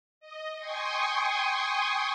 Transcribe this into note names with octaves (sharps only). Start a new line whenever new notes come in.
D#5
G5 G#5 C6 C#6 D#6